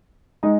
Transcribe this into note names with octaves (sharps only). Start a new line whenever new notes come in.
G#3 D#4